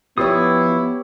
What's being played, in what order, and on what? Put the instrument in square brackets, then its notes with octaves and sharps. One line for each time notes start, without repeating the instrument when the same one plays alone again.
[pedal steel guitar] F3 F4 D#6 [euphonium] B3 [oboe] E4 [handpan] G4 B4 C#5